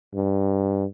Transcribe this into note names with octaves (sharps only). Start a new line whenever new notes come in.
G2